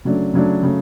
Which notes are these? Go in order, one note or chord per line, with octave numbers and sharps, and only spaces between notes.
C#3 F#3 A3 D4
C#3 F#3 A3 D4
C#3 F#3 A3